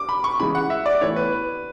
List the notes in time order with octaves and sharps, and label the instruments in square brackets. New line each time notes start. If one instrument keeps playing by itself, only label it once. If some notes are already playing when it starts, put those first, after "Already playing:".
Already playing: [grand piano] D6
B5
C#6
[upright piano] C#3 E3 G#3 [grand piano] B5
[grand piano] F#5
E5
D5
[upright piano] A2 E3 B3 E4 [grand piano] C#5
[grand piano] B4